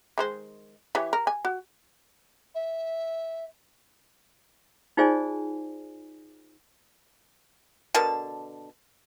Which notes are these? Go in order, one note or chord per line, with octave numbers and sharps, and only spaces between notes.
D#3 G#3 C5
E3 G4 C#5
A#4
G#5
F#4
E5
D#4 F4 G#4 C5 D5 G#5
B2 D3 A#4 A5